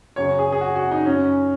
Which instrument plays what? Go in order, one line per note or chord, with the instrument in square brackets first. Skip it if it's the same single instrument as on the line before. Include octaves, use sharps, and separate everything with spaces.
[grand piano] F#2 C#3 F#3 C#5
G#4
G#4
F#4
F#4
D#4
F#2 F#3 C#4